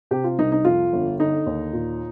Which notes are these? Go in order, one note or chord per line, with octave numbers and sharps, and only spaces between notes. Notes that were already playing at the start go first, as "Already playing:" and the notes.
C3 G4
F4
C2 D#4
D#4
F2 F4
G1
D3 D#4
D#2
A#2